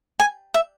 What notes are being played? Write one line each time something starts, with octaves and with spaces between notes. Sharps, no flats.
G#5
E5